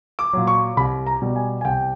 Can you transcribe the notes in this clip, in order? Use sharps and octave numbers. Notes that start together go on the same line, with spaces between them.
D6
A#2 F#3
C#6
C2 B5
A#5
B2 G3
G#5
G#5
C2 G5